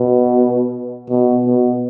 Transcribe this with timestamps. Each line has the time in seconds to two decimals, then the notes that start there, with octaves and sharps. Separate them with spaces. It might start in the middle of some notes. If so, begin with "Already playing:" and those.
Already playing: B2
1.10 B2
1.46 B2